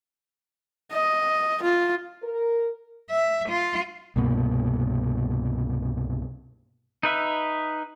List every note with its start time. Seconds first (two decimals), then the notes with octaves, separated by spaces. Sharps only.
0.92 D#5
1.63 F4
2.23 A#4
3.10 E5
3.49 F4
4.16 C2 G2 B2 A#3
7.03 D#4 B4 E5